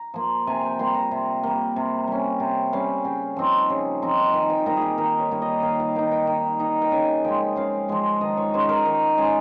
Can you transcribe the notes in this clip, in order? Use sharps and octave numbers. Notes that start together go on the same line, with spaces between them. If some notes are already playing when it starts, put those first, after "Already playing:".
Already playing: A#5
F3 A#3
C3 G#5
G5
G3 A#3 C6
A#5
C3
G3 A#3
C3
G3 C#4
C3 G5
G3 C#4 F5
C#3 G5
F3 C4 D#4
C#3
F3 C4 D#4
D#3 G#5
G5
G3 A#3 D#4 A#4
G#4
G4
D#3 A#4
C#5
G3 A#3 D#4
D#5
D#3 F5
F5
A#3 D#4 G5
G5
D#3
A#3 D#4
G5
C#3 G#5
F3 G#3 G5
C#3 F5
F3 G#3 F5
D#3 D#5
C#5
G#3 C#4 C5
A#4
D#3 A#4
G#3 C#4 G#4